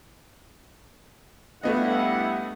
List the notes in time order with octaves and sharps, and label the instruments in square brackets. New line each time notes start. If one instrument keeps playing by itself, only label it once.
[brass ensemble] G2 E4 F#5 [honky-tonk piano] A3 B3 D#5